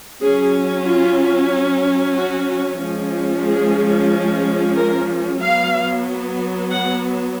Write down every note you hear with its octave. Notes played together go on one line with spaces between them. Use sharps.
F#3 C#4 G#4
F4
F#4
F3 G#3 C#4
G#4
A#4
F#3 B3 F5
F#5